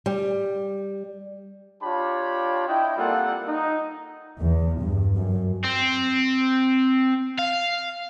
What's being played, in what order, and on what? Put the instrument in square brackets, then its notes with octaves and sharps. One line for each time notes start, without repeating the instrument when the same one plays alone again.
[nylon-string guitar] G3
[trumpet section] D4 F4 G4 C#5 A5 B5
D4 E4 D#5 G5
G3 A#3 C4 F4 A4 F#5
D#4
[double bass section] E2
G2
F#2
[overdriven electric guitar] C4
F5